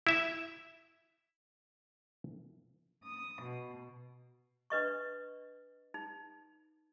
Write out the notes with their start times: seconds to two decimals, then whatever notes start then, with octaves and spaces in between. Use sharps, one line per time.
0.07 E4 E5
3.04 D#6
3.42 B2
4.70 D4 B4 D#5 C#6
5.94 D#4